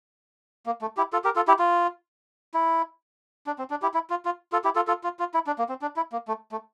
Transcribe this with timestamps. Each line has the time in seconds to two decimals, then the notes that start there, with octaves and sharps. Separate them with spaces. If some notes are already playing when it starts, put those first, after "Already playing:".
0.66 A#3
0.82 A3
0.97 E4 G4
1.13 F4 A4
1.24 G4 A#4
1.36 F4 A4
1.48 E4 G4
1.59 F4
2.54 E4
3.47 D4
3.58 C4
3.70 D4
3.82 E4 G4
3.94 E4
4.10 F4
4.25 F4
4.52 F4 A4
4.64 E4 G4
4.75 F4 A4
4.87 F4 A4
5.04 F4
5.19 F4
5.34 E4
5.47 D4
5.58 A#3
5.69 C4
5.82 D4
5.96 E4
6.12 A#3
6.28 A3
6.52 A3